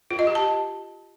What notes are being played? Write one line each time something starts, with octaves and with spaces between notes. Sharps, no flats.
F4
D#5
G4
A5